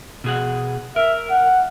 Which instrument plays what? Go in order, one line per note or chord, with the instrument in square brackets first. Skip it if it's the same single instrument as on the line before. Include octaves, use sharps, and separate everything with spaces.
[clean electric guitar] B2 G#4 F#5
[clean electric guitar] A#4 [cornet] E5
[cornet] F#5